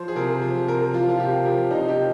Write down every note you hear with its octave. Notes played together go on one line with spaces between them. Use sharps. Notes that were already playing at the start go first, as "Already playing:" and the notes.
Already playing: F3 C5
G#4
C3 A#4
F3
C3 A#4
F3 F4
F4
C3 G4
F3 A#4
C3 D#4
G4
F3